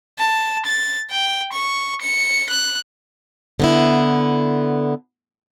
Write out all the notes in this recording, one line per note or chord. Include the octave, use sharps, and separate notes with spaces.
A5
A6
G5
C#6
C#7
F#6
D3 B3 E4